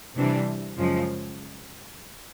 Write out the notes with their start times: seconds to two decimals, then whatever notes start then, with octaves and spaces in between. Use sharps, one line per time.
0.16 C3 E3 G3 D4
0.76 F#2 C#3 F3 G#3